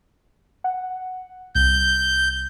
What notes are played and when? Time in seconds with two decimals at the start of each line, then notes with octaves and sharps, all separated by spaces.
0.64 F#5
1.55 C2 G6